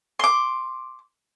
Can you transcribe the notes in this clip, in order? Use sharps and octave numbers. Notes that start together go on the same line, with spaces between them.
C6 D6